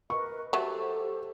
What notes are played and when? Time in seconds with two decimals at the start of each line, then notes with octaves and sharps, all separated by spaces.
0.10 A#4 B4 D#5 C#6
0.53 F#3 A3 G4 A4 C5